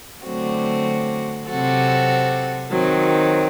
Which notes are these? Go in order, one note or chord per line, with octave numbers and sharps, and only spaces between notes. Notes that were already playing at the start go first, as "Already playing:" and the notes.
D3 F#3 A3 C4 F#4
C3 F#3 C4 F#4 A4
D#3 F#3 C4